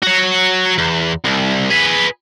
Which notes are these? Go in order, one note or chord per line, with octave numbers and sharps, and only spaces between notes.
F#4 C#5
E2
C2
G#4 B4